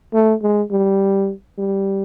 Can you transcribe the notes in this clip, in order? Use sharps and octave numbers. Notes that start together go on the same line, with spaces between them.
A3
G#3
G3
G3